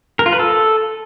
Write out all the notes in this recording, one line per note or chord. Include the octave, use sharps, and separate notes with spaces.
A#4
F4
B4
A4